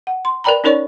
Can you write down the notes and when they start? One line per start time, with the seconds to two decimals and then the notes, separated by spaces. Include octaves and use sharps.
0.07 F#5
0.25 C6
0.44 A#4 B4 D5 G5 A#5 B5
0.64 C#4 D#4 A#4 C#5 D5 C#6